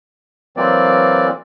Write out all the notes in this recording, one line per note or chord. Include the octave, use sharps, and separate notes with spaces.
E3 F#3 A#3 C4 D5